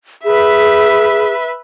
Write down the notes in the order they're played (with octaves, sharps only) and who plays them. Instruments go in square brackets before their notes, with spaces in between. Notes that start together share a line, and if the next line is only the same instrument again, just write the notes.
[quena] G#4 [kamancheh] B4 E5